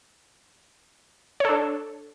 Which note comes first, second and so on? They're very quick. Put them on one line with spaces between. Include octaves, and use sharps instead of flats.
C#5 A4 D4